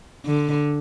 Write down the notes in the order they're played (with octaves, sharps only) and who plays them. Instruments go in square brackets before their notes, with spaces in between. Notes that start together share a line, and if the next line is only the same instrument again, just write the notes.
[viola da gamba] D3